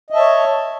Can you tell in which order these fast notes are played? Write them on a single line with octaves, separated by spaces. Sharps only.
D#5 E5 A5 C#5